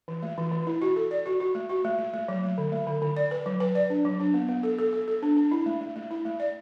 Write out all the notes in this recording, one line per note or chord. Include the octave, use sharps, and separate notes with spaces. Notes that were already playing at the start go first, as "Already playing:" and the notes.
E3
A3
E3
E3
E4
F#4
A4
D5
F#4
F#4
A3
F#4
A3
A3
A3
F#3
A3
D3
A3
D3
D3
D5
B4
F#3
B4
D5
D4
F#3
D4
B3
B3
A4
A4
A4
A4
D4
D4
E4
A3
A3
A3
E4
A3
D5